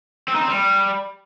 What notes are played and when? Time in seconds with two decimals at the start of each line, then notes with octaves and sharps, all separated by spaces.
0.28 C4
0.35 D#4
0.41 C4
0.48 G3